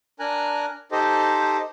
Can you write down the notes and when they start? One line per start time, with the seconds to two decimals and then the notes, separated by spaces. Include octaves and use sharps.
0.20 D4 A#4 G#5 A#5 F#6
0.92 D#4 G4 A4 C5 D#5